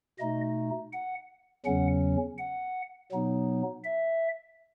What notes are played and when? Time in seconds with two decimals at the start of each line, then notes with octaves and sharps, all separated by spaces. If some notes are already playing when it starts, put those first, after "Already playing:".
0.19 B2 A3 D#4 D#5
0.93 F#5
1.65 E2 C#3 F#3 C#4 F#5
2.38 F#5
3.12 B2 F#3 B3 D#4
3.84 E5